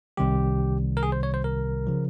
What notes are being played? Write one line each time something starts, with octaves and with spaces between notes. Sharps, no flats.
C2 C3 D#3 G3 G4
A#4
G#4
C5
C#5
C5
A#4
C#3 F3